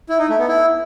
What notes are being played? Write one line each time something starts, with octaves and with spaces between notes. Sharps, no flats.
E4
D#4
A3
B3
E4